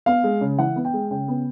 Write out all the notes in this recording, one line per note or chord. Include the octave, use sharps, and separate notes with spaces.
B3 F5
G#3
C#3
E3 F#5
B3
G5
G#3
C#3 G5
B3